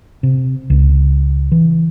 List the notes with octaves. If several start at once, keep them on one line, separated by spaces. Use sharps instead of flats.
C3
C#2
E3